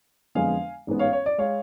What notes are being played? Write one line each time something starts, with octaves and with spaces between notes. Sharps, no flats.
F2 D3 G#3 B3 F5 G#5
A1 G#2 G#3 B3
C#5 F5
C#5
D5
G#3 C#5 F5